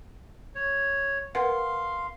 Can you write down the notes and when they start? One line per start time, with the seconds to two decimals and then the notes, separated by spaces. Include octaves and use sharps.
0.55 C#5
1.35 A#4 B4 F5 F#5 C6